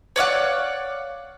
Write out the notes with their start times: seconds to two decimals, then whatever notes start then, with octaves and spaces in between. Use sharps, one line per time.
0.16 C#5 D5 F5 F#5